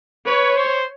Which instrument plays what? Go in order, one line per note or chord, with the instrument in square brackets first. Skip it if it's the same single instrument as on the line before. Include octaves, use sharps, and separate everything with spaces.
[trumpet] B4 [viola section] C#5
[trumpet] C5